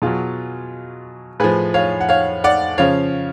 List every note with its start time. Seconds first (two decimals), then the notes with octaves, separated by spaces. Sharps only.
0.02 B2 F#3 F4 G#4
1.40 A2 F3 G#4 B4
1.74 C#5 F5
2.01 F#5
2.09 C#5 F5
2.44 D5 F#5
2.78 C#3 F3 C#5 F5